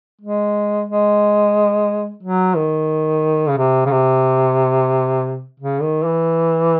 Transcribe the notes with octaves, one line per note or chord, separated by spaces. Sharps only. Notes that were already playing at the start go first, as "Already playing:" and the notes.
G#3
G#3
F#3
D#3
C#3
C3
C#3
C3
C#3
D#3
E3